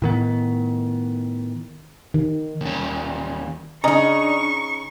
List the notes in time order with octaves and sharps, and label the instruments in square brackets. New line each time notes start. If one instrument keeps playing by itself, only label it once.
[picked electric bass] A2 D#3 B3
[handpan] D#3
[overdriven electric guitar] D#2 C#4
[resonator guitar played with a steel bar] C#3 D#4 [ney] D4 [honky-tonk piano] D#5 A#5 [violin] C#6